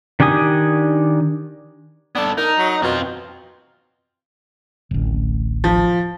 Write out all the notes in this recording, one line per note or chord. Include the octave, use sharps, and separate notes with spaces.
D#3 D4 G4 G#5 D#6
B3 D4 A4
D#4 A#4
F#3
B2 C4 F4
D1 A1
F3